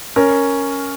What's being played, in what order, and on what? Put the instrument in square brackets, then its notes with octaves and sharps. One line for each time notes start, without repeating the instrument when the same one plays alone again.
[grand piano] C#4 A#4